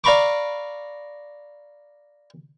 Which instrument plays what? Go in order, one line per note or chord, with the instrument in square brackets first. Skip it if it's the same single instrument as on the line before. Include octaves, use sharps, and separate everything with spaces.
[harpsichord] D5 F5 A#5 B5 C#6 D6